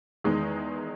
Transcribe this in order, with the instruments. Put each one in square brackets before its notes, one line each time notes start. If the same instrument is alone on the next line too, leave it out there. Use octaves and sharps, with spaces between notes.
[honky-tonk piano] E2 D#3 G#3 D#4